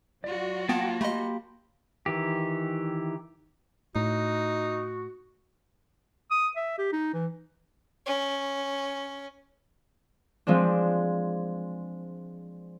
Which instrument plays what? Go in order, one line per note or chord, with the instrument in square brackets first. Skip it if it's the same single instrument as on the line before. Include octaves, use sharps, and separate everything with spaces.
[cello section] F#3 F4 F#4 [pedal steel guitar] D5
[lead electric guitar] A#3 A5 [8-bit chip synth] B3 [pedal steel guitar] F#5 G5
[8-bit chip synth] A3 D#5 [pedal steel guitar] G4 B5 C6
[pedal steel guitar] D#3 E3 G4
[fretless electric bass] A2 [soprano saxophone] D#4 [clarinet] F#4
[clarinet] D#6
E5
G4
D#4
E3
[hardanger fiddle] C#4
[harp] F3 G#3 C4 D4